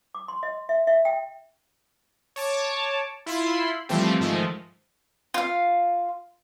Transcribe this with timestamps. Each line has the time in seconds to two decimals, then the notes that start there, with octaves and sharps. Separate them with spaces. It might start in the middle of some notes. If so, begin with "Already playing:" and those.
0.15 D6
0.28 C6
0.43 D#5
0.69 E5
0.87 E5
1.05 G5
2.36 C#5 A5 D6
3.26 E4 F4 B5 C6
3.89 E3 F3 G3 A3 C4 G4
4.20 G#2 D#3 F3 G#3 A3
5.34 F4 F5